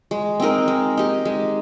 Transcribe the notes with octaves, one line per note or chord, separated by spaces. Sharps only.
G#3
C4 D#4 A#4
G#3
D#4 G4
G#3